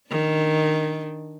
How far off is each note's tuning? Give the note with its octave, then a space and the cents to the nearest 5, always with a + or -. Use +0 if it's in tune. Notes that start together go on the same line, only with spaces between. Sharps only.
D#3 +0 D4 +0